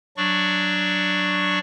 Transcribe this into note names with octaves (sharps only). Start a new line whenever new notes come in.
F#3 D4 D5 C#6